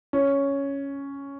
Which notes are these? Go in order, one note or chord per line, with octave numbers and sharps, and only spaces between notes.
C#4